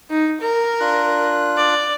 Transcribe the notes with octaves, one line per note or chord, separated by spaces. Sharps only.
D#4
A#4
D4 F4 F#6
D5